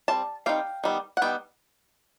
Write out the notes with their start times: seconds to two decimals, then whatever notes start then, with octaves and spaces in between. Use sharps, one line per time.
0.08 G3 C4 A5
0.46 G3 C4 D#4 F5 G5
0.84 D#3 G3 B3
1.17 F#5
1.22 D#3 G3 B3 G5